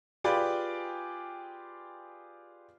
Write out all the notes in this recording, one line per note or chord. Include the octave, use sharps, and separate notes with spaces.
F4 G4 G#4 B4 D5 G5